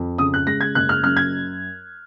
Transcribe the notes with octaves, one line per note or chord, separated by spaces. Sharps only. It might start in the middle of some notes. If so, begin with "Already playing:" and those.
Already playing: F2
C#3 D#6
F#6
G#3 A#6
G#6
F#1 F#6
F6
F#2 F6
G#6